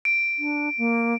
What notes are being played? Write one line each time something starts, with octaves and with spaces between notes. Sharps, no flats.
D7
D4
A#3